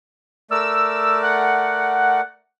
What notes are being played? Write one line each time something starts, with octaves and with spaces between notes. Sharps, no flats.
A3 A#4 D5 E6
F#5